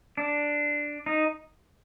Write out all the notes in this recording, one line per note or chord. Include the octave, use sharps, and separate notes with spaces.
D4
D#4